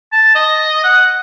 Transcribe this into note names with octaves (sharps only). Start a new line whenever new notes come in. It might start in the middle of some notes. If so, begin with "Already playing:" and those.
A5
D#5
F#5